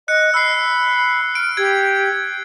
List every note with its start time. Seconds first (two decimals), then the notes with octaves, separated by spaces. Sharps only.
0.08 D#5 F#6 C#7
0.34 B5 E6 C7
1.35 F6 D7
1.57 G4 G#6 D7